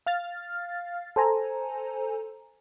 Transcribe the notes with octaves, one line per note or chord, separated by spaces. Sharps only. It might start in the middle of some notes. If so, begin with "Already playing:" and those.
F5 F6 A6
A4 C5 G#5 A#5